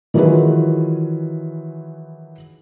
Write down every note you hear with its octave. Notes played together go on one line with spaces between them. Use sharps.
D#3 E3 F#3 F4 G#4 B4